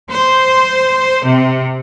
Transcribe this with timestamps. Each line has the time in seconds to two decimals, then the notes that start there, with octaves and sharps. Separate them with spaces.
0.11 C5
1.25 C3